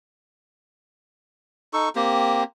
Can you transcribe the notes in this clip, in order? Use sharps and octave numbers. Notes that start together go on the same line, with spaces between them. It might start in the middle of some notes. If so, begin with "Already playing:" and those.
D#4 A4 C#6
A#3 C4 G4